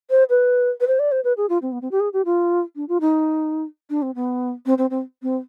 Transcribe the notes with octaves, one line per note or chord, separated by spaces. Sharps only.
C5
B4
B4
C5
D5
C5
B4
G#4
F4
C4
B3
C4
G4
G#4
G4
F4
D4
F4
D#4
D4
C4
B3
C4
C4
C4
C4